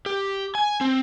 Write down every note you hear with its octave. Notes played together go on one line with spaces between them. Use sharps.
G4
G#5
C4